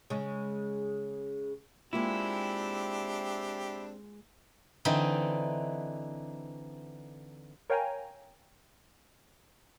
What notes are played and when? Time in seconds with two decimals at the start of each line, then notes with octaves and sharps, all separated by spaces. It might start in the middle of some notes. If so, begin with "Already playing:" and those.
0.10 C#3 G#3
1.93 G#3 A#3 C4 D4 E4 F4 G4
4.85 D3 E3 C4 D#4
7.70 A#4 C#5 F5 G5 G#5 A#5